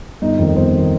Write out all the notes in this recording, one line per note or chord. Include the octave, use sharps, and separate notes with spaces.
G1 D#4
F2 D#3
G1 C5
D#3